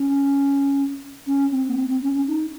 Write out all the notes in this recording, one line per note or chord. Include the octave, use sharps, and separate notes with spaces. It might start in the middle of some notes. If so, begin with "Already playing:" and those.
Already playing: C#4
C#4
C4
A#3
C4
C4
C#4
C#4
D#4